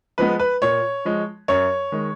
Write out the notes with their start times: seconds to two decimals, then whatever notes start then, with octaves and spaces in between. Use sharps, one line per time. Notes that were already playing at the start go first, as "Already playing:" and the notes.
0.18 F3 G#3 B3 B4
0.39 B4
0.62 A#2 C#5
1.05 F3 G#3
1.48 F#2 C#5
1.92 D#3 G#3